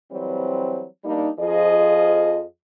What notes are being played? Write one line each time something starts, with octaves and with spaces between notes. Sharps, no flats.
E3 F#3 G3 C4
G3 A#3 D4 D#4
F2 F3 F4 G#4 D#5